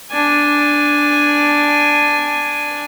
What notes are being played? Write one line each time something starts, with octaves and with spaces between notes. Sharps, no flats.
D4 G#5